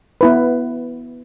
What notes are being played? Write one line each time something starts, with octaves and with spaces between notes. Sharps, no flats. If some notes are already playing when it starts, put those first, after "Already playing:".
B3 E4 B4